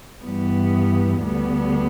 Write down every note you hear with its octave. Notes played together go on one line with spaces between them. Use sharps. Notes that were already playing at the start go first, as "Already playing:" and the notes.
G2 E3 G3 B3
D2 D3 G3 B3